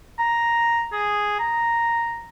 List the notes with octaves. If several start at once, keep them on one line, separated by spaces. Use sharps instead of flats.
A#5
G#4
A#5